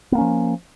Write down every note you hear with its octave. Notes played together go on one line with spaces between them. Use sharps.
F3 A#3 B3 C#4